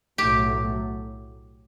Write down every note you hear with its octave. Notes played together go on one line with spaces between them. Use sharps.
B1 A2 F#3 A3 G4